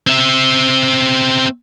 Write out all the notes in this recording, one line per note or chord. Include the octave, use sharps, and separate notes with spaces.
C4 E5